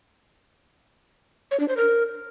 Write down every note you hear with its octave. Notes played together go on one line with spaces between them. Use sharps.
C#5
D4
C5
A#4